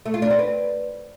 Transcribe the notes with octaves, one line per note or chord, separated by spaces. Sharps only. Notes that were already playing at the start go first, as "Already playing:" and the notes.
A3
F4
D4
C4
B4